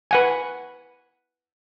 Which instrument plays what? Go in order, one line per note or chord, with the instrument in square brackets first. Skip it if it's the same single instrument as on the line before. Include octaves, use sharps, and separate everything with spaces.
[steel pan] B4 F#5 G#5